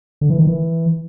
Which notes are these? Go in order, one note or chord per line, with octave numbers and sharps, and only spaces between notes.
D3
E3
D#3
E3